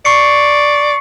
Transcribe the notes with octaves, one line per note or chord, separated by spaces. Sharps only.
D5 C#6 C7 C#7